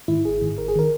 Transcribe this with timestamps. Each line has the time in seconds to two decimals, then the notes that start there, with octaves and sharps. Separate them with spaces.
0.08 G#2 D#3 E4
0.25 G#1 G#4
0.41 G#2 D#3
0.58 G#1 A#4
0.68 G#4
0.76 D#3 A#4